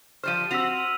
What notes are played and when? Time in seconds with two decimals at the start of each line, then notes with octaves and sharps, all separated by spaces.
0.23 F3 G3 C5 F6 D#7
0.51 C4 F#4 E6 B6 F7